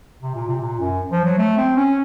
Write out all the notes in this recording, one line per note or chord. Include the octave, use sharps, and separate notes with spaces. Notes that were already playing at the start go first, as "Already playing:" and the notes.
C3
A#2
C3
A#2
F#2
F3
F#3
A3
C4
C#4